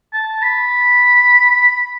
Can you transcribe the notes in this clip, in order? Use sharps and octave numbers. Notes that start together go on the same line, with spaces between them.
A5
B5